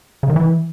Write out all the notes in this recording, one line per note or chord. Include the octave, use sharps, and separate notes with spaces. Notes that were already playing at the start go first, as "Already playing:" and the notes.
C#3
D#3
E3